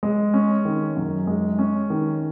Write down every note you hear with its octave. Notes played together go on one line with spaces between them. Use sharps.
G#3
C#4
D#3
F#2
G#3
C#4
D#3